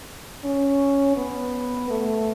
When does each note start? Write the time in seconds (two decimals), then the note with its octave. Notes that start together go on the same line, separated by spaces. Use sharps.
0.45 C#4
1.17 B3
1.90 A3